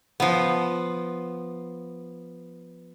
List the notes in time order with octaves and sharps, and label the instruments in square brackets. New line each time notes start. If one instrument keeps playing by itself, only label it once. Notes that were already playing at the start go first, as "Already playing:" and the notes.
[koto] F3 B3